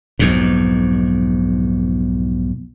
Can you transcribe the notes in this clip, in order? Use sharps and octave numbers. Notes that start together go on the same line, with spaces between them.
B1 F2 G#2